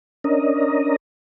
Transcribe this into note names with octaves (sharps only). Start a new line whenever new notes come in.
C#4 D4 A#4 D#5